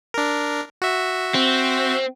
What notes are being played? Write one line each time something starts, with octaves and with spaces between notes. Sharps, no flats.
D4 A#4
F#4 E5
C4